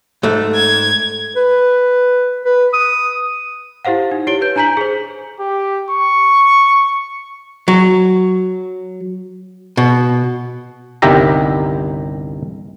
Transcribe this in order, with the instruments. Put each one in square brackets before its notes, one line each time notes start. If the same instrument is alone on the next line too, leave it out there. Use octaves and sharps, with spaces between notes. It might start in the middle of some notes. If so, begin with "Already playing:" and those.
[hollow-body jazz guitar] G#2 A3
[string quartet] G#6
[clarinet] B4
B4
D#6
[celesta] E4 G4 C5 F5 F#5
D#4
E4 G4 C#5 D7 G7
B4 G6
D4 G#5 A#5 G6 B6 F#7
G#4 C5
[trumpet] G4
C#6
[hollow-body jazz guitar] F#3
B2
[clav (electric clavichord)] G1 C2 D#3 G4 E5 A#5